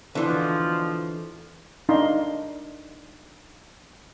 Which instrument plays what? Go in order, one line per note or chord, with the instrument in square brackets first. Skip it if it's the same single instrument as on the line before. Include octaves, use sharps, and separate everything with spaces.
[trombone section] B2 F3 [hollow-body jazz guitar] D3 E3
[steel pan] D4 D#4 D#5 F5 A#5 C6